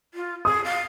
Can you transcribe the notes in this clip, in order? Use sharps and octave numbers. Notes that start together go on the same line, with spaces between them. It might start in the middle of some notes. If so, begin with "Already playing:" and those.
F4
G#4 D#6
F5